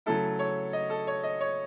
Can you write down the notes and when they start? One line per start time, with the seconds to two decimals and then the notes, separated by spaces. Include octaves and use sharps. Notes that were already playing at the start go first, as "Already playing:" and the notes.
0.06 C#3 F#3 A3 E4 A4
0.39 C#5
0.73 D#5
0.90 A4
1.07 C#5
1.23 D#5
1.41 C#5